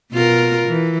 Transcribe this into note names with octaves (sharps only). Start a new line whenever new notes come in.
B2 F4 A#4
E3